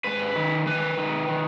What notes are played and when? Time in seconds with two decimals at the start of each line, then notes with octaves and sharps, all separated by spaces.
0.04 G#2 B4
0.36 D#3
0.66 D#3 B4
0.98 D#3
1.29 D#3